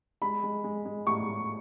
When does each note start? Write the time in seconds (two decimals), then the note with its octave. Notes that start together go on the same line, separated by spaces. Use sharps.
0.22 G#3 B5
0.43 G#3
0.64 G#3
0.85 G#3
1.06 A2 C#6
1.27 A2